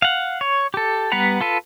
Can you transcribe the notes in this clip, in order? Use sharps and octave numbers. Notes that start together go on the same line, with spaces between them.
F5 F#5
C#5
G4 A4
G3 B3 B4 F#5 A#5
F4 A4 B4